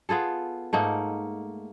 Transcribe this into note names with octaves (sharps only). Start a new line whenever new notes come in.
B3 F4 G#4 A4
G#2 A3 A#3 D#4